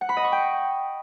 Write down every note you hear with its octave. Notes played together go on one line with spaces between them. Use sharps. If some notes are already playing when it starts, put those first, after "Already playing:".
F#5
B5
D#5
C#6
G5